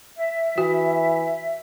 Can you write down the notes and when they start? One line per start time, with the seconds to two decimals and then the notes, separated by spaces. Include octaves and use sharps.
0.17 E5
0.58 E3 F#4